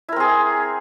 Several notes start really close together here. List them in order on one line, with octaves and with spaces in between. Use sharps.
E4 A#4 C4 G#4